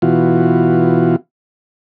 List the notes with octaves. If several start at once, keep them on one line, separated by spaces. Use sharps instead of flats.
B2 E3 F4 F#4